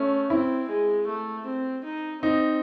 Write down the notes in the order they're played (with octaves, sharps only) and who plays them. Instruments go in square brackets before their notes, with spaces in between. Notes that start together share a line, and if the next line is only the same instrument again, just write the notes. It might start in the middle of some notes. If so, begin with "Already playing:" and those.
Already playing: [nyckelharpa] A3 [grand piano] C#4
[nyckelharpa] C4 [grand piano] E4
[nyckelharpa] G#3
A3
C4
D#4
[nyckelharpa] C4 [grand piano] D#4